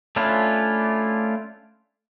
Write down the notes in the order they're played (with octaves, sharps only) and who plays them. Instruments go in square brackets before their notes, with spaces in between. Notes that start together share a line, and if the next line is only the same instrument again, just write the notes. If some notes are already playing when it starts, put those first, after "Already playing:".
[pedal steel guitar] A3 C#4 D4 E4 F4